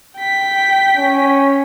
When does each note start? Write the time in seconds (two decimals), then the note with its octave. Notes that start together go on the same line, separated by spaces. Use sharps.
0.19 G5 B6
0.97 C#4